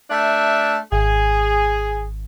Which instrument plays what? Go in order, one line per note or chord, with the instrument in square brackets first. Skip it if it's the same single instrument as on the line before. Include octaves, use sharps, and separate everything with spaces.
[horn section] A3 D4 E5
[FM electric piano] G#1 [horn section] G#4